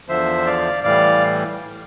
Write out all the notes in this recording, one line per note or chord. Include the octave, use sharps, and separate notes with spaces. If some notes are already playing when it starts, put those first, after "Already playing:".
E2 D3 F3 C5 E5
D5 F5
A2 E3 G3 D5 F5